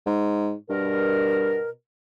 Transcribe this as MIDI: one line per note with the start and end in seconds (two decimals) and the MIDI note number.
0.06 0.53 44
0.70 1.57 43
0.70 1.68 47
0.70 1.68 70